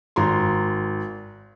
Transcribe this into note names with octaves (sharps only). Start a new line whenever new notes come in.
G#1 A#5 C6